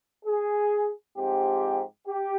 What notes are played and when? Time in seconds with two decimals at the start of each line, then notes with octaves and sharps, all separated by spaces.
0.25 G#4
1.16 G#2 F3 C4 G4
2.08 G4